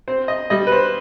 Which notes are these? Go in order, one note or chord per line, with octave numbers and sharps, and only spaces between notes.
C4 C5
D#5
G3 D#5
B4
C5